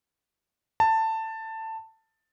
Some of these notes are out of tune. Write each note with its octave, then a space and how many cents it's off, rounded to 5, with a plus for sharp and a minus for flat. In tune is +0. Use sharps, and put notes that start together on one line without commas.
A5 +15